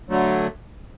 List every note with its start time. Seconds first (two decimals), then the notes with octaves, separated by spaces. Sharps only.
0.09 D3 F#3 A3